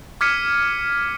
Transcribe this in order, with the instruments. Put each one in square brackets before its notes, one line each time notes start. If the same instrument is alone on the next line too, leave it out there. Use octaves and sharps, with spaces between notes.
[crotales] D6 F6 G#6 B6 C#7 D#7